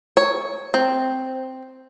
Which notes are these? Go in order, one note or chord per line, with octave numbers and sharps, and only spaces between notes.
C#5
C4